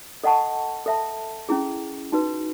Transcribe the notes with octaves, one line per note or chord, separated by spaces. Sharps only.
A4 D#5 F#5 A5 C#6
A4 E5 A5
C#4 E4 G#4
D#4 F#4 B4